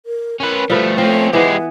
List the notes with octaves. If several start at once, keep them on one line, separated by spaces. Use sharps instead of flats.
A#4
C#4 A#4 B4
F3 G3 A3 A4 B4
F3 A3 C4 C#4
E3 G#3 B3 G4 B4